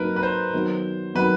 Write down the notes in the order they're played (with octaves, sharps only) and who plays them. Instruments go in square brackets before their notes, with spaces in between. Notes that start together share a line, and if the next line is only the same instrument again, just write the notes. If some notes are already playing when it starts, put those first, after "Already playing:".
Already playing: [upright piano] F#3 A#3 D#4 [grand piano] A#4 B4
[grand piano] B4
C5
[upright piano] D#3 F#3 B3
[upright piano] D#3 F#3 B3 [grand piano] B4